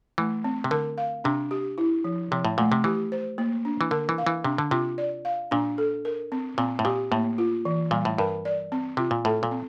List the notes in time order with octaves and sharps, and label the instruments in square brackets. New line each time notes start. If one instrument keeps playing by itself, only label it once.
[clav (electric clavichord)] E3 [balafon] A3
[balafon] C4
[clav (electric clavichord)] C3
[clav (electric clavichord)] D3 [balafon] A#4
[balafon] F5
[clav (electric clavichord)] C3 [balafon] D4
[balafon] G4
E4
F3
[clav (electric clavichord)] C3 [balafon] F3
[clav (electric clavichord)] A2
[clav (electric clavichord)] A#2 [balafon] A3
[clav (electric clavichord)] C3
[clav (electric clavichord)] E3 [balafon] G4
[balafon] C5
A#3
D4
[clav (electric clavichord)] E3
[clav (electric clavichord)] D3 [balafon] A#4
[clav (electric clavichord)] E3
[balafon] F5
[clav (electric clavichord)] E3
[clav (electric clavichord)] C3 [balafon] D4
[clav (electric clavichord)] D3
[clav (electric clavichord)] C3 [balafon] F4
[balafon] D5
F5
[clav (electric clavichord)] A#2 [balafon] D4
[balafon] A4
A#4
C4
[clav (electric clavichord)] A#2 [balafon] C4
[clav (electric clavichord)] A2
[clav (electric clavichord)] A#2 [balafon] G4
[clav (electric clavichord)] A2 [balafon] A#3
[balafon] F4
E3
[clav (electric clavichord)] A#2 [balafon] G3
[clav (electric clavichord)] A2
[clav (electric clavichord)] G2 [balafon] A#4
[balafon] D5
C4
[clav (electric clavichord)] C3 [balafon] F4
[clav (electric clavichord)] A#2
[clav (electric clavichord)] A2 [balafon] A4
[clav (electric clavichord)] A#2
[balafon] C4